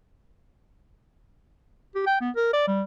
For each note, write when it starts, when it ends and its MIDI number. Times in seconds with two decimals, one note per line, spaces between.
1.95 2.03 67
2.06 2.16 79
2.21 2.30 59
2.36 2.53 70
2.53 2.67 74
2.67 2.82 55